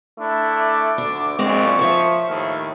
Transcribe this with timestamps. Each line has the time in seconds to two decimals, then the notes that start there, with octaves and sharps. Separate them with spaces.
0.18 A3 D4 E4
0.53 D6
0.98 D2 D4
1.39 A#1 F#2 A#2 G#3 C4 C#6
1.79 F3 C5 C#5 E5
2.28 D#2 A2 F5